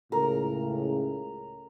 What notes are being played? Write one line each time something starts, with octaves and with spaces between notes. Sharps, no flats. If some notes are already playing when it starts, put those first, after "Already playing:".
C#2 A2 C#3 A#4